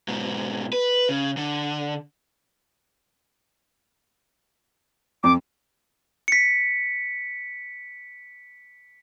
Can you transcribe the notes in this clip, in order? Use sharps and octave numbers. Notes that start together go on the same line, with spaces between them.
G#2 B2
B4
C#3
D3
F2 D6
B6 C#7